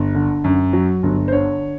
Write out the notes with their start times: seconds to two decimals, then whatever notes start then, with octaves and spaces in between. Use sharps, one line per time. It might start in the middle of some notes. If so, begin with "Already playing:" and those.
Already playing: G1
0.14 D3
0.44 F#2
0.73 F#3
1.03 G1
1.28 C5
1.32 D3 C#5